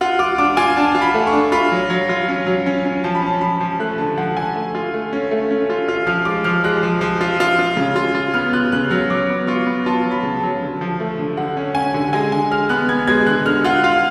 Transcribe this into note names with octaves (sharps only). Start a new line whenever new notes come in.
F4 F#5
F4 D6
D4 D6
F4 G#5
D4 A5
F4
B5
A3
C#6
D4
F4 B5
F#3
F#3
F4
C#4
F#3
C#4
C#4
F3 A5
B5
C#4 A5
F3 B5
F3
A3 F#6
D3 A5
F3 F#5
D3 G#5
A3
F4
A3
C#4
A3
C#4
F4
F4
F3 F6
G#3 D6
F3 F6
G#3 F#6
F3
F3
F4
F4
F4
C#3
F4
F4
B3 F6
F4 F#6
C#3 F#6
F#3 F6
F#3 D6
B3
F4 C#6
B3
F4 A5
F#3
B5
C#3
A5
F#3
D3
F3
A3
D3
D3 F#5
C#4
C#4 G#5
D3
G#3 G#5
D3 G#5
G#3 F6
B3 F#6
B3 G#6
G#3 G#6
D3 F#6
D3 F6
F4 F#5
F4 F5